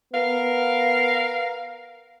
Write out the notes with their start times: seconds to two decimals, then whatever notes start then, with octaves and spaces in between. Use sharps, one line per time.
0.13 B3 A#4 F5